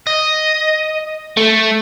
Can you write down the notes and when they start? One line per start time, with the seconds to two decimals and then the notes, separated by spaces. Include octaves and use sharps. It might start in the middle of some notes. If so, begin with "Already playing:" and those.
0.07 D#5
1.37 A3